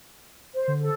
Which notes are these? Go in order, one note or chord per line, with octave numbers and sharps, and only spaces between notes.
C5
D3
A4